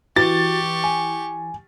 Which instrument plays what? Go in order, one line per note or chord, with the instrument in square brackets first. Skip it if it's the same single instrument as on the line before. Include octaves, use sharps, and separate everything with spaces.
[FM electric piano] E3 [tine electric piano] F#4 [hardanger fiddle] G4 C#6 [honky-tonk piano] A6
[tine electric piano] G#5